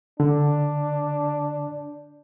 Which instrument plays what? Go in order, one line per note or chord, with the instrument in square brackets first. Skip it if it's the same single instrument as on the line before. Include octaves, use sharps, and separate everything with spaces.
[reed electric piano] D3 [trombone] D4